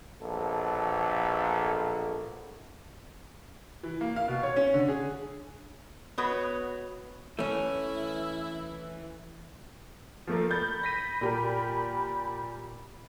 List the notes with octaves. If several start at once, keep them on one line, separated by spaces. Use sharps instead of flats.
A#1 B2 A4
E3
A#3
F5
B2
C#5
C#4
D3
G#4
B3 F#4 B4 C#5 D#5
E3 A3 C#4 E4
F3 A3 A#3
B5 G6 A6
A#6 B6 D#7
A#2 G4 A#4